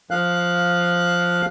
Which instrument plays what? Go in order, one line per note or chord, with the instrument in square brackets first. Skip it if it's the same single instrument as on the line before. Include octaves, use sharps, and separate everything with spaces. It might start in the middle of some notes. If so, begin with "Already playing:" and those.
[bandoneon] F3 F5 F#6